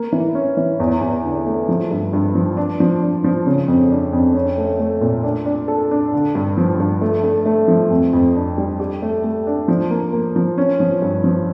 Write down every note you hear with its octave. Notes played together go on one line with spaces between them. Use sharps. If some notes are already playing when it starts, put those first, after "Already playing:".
Already playing: A#3
E3
C#4
E3
E2
E2
D3
A3
F3
G2
G2
F3
D4
F3
D4
F3
C#3
F2
D4
F2
C#4
A3
A3
A#2
D4
D4
A4
D4
D3
G2
F3
G2
A3
A3
A3
F3
F2
F2
D4
G3
G4
A3
A3
D4
F3
A#3
A#3
F3
C#4
F3
G2
F3